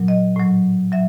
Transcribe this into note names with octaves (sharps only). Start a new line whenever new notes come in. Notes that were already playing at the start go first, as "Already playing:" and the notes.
Already playing: A#2 F#3
D#5
A2 F#3
F#3 E5